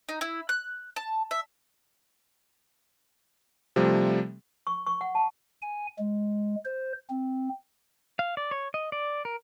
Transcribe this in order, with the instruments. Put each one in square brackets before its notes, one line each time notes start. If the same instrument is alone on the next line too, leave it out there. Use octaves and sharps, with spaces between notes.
[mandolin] D#4
E4
F#6
A5
E5
[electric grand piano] C3 F3 G3 A3
[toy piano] C#6
C#6
F#5
A5
[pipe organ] G#5
G#3
C5
C4
[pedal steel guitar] F5
D5
C#5
D#5
D5
A#4